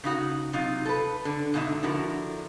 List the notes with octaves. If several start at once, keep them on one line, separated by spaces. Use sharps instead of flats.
C#3 D#4 F#4 F#5
C3 F#3 D#4 F4
A4 B4
D3
G#2 B2 D3 D#4 E5
D3 F3 E4 F#4 A#4